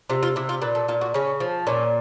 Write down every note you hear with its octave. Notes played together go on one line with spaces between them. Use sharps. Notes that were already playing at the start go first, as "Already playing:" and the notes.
C3 F4
F4
C3 E4
F4
A#2 B4
A4
A#2 F4
F#4
C#3 C#4
F3
A#2 C#4